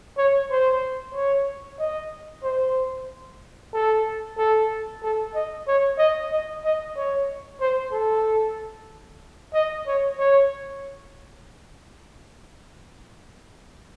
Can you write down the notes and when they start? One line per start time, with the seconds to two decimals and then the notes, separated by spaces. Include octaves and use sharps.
0.18 C#5
0.51 C5
1.14 C#5
1.79 D#5
2.43 C5
3.73 A4
4.38 A4
5.03 A4
5.35 D#5
5.67 C#5
5.98 D#5
6.31 D#5
6.64 D#5
6.96 C#5
7.60 C5
7.92 A4
9.53 D#5
9.86 C#5
10.19 C#5